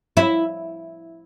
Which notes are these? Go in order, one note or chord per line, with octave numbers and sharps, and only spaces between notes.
E4